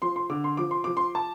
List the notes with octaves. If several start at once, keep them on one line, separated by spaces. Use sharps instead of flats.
F3 C6
C6
D3 D6
C6
F3 D6
C6
F3 D6
C6
A5